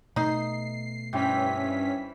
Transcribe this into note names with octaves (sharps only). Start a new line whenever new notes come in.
B2 A3 D#4 D#5 C7
G2 E3 C4 C#4 G5 B6